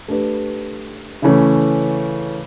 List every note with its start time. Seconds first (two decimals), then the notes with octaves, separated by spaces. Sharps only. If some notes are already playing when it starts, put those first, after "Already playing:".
0.08 A3 D4 G4 B4
1.22 C#3 E3 A3 C#4